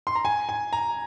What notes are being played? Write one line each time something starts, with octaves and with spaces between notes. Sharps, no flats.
C6
A#5
G#5
G#5
A#5